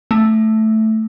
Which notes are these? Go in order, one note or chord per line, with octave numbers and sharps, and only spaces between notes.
A3